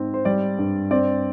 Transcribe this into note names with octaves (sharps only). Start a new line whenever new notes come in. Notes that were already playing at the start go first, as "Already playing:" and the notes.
Already playing: G#2 C4
C5
G3 D5
G2
C4 D5